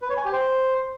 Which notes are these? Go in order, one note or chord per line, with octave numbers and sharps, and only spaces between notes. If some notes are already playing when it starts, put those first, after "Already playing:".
B4
C#5
G#5
G4
C5